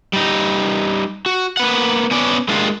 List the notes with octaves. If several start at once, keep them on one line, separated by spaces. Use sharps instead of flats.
G3 D#4
F#4
A#3 B4 F#5
B3 C#4 D4 D5
G#3 A#3 D4 F4 G4